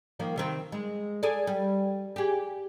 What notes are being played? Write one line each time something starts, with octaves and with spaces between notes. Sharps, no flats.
D#3 F3 A#3
C3 D#3 C4
G#3
G#4 A4 D5
G3
G4 G#4